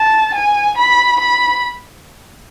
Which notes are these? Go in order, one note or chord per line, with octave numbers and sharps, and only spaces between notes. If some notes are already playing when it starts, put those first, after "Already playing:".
Already playing: A5
G#5
B5
B5